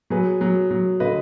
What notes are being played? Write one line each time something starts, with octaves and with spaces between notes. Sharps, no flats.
F#3 G#4 B4
F#3
F#3
D3 B4 D#5